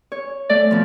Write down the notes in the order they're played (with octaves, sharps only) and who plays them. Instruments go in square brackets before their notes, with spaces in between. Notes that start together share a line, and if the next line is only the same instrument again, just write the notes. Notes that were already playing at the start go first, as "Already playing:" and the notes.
[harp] C#5
[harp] A3 [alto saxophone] D5
[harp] B2 F3